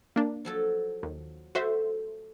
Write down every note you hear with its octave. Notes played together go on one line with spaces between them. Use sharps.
A#3 D4
F3 F#3 A4
D#2
A3 F#4 C5 E5